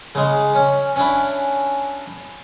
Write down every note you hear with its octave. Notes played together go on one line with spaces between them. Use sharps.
C#3 G#3
C#4
C#4 D4 E4